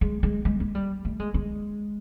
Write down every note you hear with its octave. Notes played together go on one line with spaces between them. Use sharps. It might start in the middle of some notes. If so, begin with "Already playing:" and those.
G#3
G#3
G#3
G#3
G3
A3
G#3
G#3